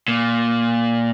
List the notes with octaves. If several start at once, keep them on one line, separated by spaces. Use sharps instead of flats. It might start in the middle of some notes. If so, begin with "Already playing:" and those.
A#2